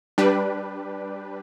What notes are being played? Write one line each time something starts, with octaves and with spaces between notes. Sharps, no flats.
G3 D4 G4 B4